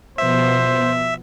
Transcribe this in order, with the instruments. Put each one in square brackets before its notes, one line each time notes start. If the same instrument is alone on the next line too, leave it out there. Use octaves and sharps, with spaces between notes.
[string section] B2 F3 B3 [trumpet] C5 [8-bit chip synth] E5